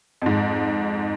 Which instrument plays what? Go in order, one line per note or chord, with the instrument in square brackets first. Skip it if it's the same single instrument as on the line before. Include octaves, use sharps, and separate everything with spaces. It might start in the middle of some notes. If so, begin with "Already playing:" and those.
[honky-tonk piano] F2 G#2